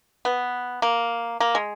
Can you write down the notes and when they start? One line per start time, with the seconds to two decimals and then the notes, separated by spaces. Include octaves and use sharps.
0.25 B3
0.82 A#3
1.40 A#3
1.55 G#3